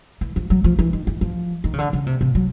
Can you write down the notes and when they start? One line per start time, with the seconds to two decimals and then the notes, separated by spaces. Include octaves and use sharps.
0.21 E3
0.36 F3
0.50 F#3
0.64 F3
0.79 E3
0.93 D#3
1.07 E3
1.21 F3
1.64 D#3
1.73 C#3
1.78 D3
1.93 C#3
2.06 C3
2.21 C3
2.35 F#3